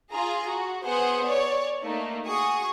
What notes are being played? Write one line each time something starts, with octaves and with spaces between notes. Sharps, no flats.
F4 G#4 A#5
F#4
B3 G#4 C5 F#5
C#5 D5
A3 A#3 D#4
F#4 G#4 C#6 D#6